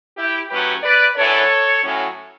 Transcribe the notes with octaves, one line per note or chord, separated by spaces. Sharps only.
E4 G4
A2 F#3 A3 C#4 G4 B4
B4 D5
F#2 E3 B3 D4 A4 C#5
A2 F#3 C#4